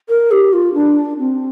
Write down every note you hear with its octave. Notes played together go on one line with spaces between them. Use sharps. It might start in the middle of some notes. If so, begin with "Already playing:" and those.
A#4
G4
F4
D4
C4